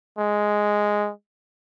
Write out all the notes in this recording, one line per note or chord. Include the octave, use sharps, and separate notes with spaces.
G#3